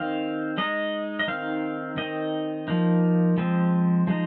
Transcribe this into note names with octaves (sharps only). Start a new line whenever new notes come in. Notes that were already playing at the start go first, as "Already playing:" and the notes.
Already playing: D#3 C4 D#4 F5
G#3 D#4 D#5
D#5
D#3 C4 D#4 F5
D#3 C4 D#4 D#5
F3 A#3 D#4
F3 G#3 C4
F3 G#3 D#4